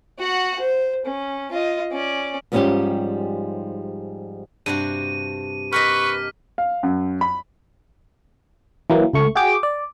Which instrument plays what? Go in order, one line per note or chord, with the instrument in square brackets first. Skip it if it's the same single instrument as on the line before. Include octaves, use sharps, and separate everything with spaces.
[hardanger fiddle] F#4 F#5
C5
C#4
F4 D#5
C#4 D5
[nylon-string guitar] G#2 F3 G3 C#4 D#4 G4
[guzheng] G2 C3 F#4 [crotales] D#7
[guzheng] G4 A#4 D#5 [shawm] B4 [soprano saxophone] C#6 [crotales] F6 B6
[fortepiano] F5
F#2
B5
[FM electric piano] E3 F#3 A#3
C#2 A3 C#6
F#4 G#4 G5 D6
D5